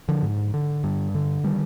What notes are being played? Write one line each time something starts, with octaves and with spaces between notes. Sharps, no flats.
D3 F3
G#2
D3
G2
D3
D#3 G3